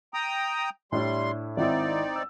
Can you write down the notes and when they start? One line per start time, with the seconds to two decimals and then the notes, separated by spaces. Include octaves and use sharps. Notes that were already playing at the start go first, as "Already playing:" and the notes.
0.14 G5 A#5 D#6
0.92 A2 G3 D4 E4 C6
1.57 G#1 C4 D#4 E4 D5
2.16 E6